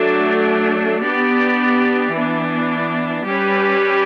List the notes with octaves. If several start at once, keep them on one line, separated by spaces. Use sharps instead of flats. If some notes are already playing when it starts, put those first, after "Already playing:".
Already playing: F#3 A3 D4
B3 D4 G4 D5
E3 B3 D4
G3 C#4 G4 B4